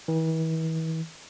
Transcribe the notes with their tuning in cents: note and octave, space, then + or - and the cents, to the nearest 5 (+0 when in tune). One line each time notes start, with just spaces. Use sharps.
E3 -40